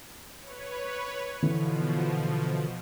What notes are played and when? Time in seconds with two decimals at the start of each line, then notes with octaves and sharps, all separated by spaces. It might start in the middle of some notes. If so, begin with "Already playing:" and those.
0.39 B4 C#5
1.43 B2 D3 E3 F3